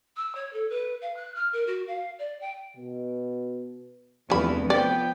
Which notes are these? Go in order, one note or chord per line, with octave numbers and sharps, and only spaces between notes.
E6
C#5
A4
B4
F5
F#6
F6
A#4
F#4
F5
D5
G5
B2
F1 E2 G2 E3 F3 B5
F3 B3 D5 G5